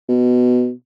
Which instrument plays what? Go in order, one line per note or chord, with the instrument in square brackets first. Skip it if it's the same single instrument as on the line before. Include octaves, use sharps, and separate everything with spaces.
[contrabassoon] B2